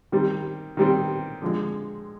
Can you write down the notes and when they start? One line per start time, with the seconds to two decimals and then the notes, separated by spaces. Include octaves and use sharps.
0.12 D#3 G3 C4
0.77 D#3 G3 C4
1.42 D3 F3 G#3